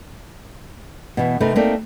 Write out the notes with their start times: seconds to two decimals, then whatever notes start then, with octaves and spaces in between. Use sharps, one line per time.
1.17 B2 E3
1.40 C3 A3 C4 D#4 A#4 B4
1.55 A3 A#3 C4 D#4 A#4 D5